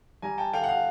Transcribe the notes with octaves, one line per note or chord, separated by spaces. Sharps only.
G3 G#5 A#5
G5 A5
D3 F5 G5
F#5
F5